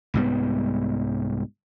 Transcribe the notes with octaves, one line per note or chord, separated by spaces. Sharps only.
C2 G#2 G3 B3